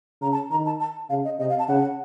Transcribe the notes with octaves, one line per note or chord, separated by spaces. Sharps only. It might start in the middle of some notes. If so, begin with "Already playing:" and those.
C#3 A#5
A5
D#3 A#5
A5
A5
C#3 F5
D#5
C3 D#5
F5
A5
C#3 F#5